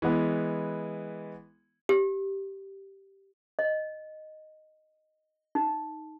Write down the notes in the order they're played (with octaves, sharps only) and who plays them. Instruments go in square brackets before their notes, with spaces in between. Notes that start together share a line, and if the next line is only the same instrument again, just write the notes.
[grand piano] E3 G#3 B3
[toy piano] G4
D#5
D#4